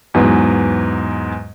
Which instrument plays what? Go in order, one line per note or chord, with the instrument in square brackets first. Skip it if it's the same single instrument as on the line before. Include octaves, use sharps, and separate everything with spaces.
[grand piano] E2 G#2 F#3 B3